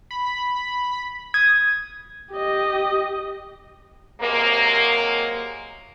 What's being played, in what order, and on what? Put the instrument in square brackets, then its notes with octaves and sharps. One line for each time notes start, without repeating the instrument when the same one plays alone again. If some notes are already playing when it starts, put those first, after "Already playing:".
[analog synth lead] B5
[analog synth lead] D#6 [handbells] G#6
[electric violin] G4 D#5
[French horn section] C3 F#3 G#3 A#3